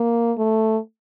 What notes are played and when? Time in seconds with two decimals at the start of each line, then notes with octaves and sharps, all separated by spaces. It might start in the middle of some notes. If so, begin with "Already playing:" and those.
Already playing: A#3
0.38 A3